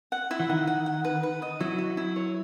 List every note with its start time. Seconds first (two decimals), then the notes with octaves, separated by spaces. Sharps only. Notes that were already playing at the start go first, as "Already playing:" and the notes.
0.12 F#5
0.31 E4
0.40 E3
0.49 D#3 F#5
0.67 F#5
0.86 F#5
1.04 B4
1.23 B4
1.42 D#5
1.60 F#3 E4
1.78 E4
1.97 E4
2.16 C#5